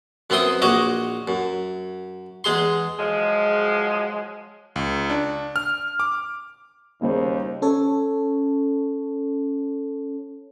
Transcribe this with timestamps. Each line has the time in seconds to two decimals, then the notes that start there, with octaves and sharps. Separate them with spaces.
0.30 F#2 B3 C4 E4 C6 D#6
0.62 A#1 F#4 C#5 D#5 D6
1.28 F#2
2.44 E2 G#3 G#4 C6
2.99 F3 F#3 G#3
4.76 C#2
5.10 D4
5.56 F6
6.00 D6
7.02 D#2 C#3 G3 C5
7.62 C#4 A4 C#5